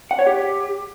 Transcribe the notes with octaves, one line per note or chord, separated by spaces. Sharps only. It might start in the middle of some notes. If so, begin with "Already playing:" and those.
F#5
C#5
G4